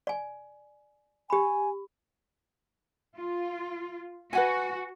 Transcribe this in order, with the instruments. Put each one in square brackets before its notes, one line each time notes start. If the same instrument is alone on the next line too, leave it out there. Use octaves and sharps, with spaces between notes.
[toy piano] D5 G#5
[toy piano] G4 B5 [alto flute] G#5
[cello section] F4
[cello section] F#4 [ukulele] B4 F#5 G#5